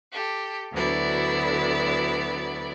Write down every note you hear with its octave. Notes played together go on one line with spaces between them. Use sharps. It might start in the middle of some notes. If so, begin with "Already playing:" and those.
G4 A4
D2 D3 F#3 B3 E4 D5